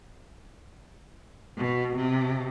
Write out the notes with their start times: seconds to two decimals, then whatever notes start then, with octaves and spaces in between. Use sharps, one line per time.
1.58 B2
1.97 C3